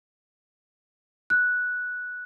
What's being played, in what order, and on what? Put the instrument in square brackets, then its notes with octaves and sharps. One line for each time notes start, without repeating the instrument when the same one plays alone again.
[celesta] F#6